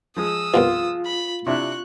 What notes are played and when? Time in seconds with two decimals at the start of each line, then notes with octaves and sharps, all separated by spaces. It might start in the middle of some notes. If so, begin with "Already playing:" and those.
0.17 F3 G#3 D#6 E6
0.54 C2 G2 B2 F4
1.06 B5
1.46 C3 D4 E4 C#6 F#6